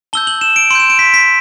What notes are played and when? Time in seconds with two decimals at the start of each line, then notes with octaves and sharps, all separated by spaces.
0.13 A5 E6 G6 G7
0.27 F#7
0.41 E7
0.56 D7
0.71 C6 D7
0.75 G6 E7
0.90 D7
0.99 B6
1.14 B6